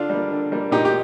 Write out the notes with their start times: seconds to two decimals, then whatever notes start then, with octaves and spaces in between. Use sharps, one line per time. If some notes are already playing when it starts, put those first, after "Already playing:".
Already playing: D3 D4 F4
0.10 G3
0.15 A#3
0.31 D3
0.52 G3 A#3
0.71 A#2 D#4 G4
0.85 G4